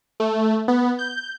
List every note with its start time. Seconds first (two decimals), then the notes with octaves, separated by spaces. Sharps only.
0.20 A3
0.68 B3
0.99 G6